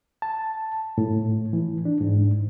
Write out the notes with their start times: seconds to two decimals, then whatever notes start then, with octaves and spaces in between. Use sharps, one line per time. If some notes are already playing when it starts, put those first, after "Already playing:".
0.22 A5
0.98 A2
1.53 E3
1.85 D4
2.01 G#2